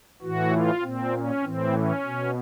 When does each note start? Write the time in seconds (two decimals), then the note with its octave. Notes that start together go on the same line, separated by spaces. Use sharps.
0.22 A2 E3 F#4
0.52 F4
0.82 A#2 C4
1.13 C#4
1.43 A2 E3 C4
1.73 C#4
2.04 B2